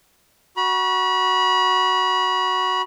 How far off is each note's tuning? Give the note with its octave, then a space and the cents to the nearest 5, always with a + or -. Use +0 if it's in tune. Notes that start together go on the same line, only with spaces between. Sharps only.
F#4 +0 B5 -35